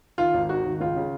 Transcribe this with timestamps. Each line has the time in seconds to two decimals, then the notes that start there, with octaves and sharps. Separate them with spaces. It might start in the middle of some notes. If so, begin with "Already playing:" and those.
0.18 D#3 F4
0.34 G#1
0.49 D#3 F#4
0.66 G#1
0.80 C#2 F4
0.96 C#3